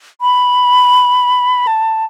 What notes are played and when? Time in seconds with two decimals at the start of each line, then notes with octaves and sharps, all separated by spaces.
0.21 B5
1.67 A5